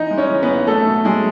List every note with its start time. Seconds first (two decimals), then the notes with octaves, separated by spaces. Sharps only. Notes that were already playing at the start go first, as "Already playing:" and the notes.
Already playing: E3 D#4 D#5
0.11 G#3
0.18 C#4 C#5
0.30 E3
0.42 B3 B4
0.48 A1
0.67 F#3 A3 A4
0.87 B2
1.05 F#3 G#3 G#4